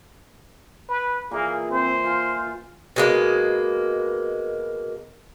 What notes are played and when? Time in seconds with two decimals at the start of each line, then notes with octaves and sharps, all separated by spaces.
0.89 B4
1.31 A#2 E3 A#3 G#4
1.71 C4 C5
2.04 F4 F5 G#5 C6
2.96 B2 G#3 A#3